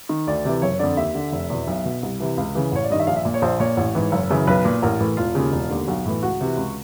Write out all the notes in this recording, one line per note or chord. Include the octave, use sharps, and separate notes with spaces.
D#3
D2 D5
C3 E3
F#1 C#5
F2 D3 D5
D#2 E5
D3
F1
E2 B2
B1
B2
C2
C3 E3
C#2 F5
C#3 E3
A1 C#5
D5
G2 D#3 D#5
E5
A#1 F5
E5
A#2
C#5
A#1 C5
A#2 C#5
A1
G#2 E3
F#1
F#2 C#3 E3
B1 B4
A#2
A1 A#4
A2 E3
E1 F4
D#2 C#3
E1
D#2 D3
B1 F#4
A2 E3
C#2 F#4
C3 E3
C#2